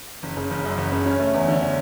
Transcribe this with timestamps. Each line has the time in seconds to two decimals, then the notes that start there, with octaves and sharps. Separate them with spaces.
0.23 F#1
0.37 C#3
0.51 F#1
0.64 F#2
0.78 F#1
0.92 C#3
1.06 C#4
1.19 A3
1.34 E2
1.48 D3
1.62 C#4